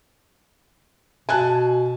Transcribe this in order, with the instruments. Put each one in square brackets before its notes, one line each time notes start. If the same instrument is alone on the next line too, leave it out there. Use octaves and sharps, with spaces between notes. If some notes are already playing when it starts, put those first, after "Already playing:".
[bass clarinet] B2 [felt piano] G#5 A5 F#6